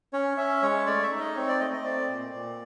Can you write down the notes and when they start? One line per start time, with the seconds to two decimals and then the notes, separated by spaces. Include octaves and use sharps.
0.13 C#4 C#5
0.37 C#4 E5
0.62 G#3 C#5
0.86 A3 D5
1.03 E5
1.11 D#4
1.20 D#5
1.36 C4 C#5
1.48 D5
1.60 A3 D#5
1.73 D#5
1.85 C4 D5
2.09 A#2
2.34 A#2